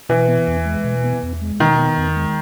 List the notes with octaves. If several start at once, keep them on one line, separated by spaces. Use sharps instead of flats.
B2 E3
B3
E2
G#3
B2
B3
E2
G#3
B2 D#3
B3
E2
G#3